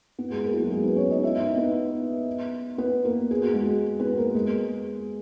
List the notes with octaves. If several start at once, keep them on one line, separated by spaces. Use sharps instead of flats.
B3
F#4
G#3 G#4
A#3 A#4
E4
F#3 F#4
G#3 G#4
B3 B4
C#4 C#5
D#4 D#5
E4 E5
D#4 D#5
B3 B4
B3 B4
A#3 A#4
G#4
F#4
G#3 G#4
B3 B4
A#3 A#4
G#3 G#4